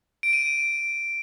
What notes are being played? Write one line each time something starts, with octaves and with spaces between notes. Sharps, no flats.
D7
D#7
D7